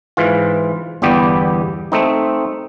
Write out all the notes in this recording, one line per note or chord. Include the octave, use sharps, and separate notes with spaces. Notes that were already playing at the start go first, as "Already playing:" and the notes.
G#2 E3 F4
G1 E2 G3 B3 G4
A3 C4 D#4